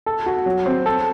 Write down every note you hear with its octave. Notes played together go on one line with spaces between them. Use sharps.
A4
F#4
F#3
C4
A4